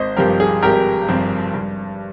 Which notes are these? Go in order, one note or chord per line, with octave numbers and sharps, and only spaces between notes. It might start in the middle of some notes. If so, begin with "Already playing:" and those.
Already playing: G#1 C5 D#5
G2 F3 C4 G4 A#4
G#4
G#1 G4 A#4
G2 F3 C4
G2